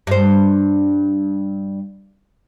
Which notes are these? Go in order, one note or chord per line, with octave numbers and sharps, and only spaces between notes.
G2 C5